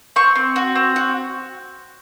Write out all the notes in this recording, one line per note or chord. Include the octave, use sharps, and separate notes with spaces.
C4 C#6
C4
F#4
C4
F#4